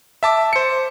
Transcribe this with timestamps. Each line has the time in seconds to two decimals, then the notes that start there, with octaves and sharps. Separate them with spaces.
0.23 E5 A5 D6
0.53 C5 C#7